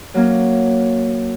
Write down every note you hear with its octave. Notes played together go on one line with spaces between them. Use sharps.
F#3 A#3 C#4